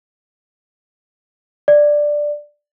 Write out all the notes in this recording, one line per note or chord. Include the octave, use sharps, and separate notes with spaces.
D5